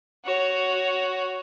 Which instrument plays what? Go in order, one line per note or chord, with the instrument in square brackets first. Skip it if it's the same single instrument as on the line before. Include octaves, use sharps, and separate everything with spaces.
[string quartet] F#4 C#5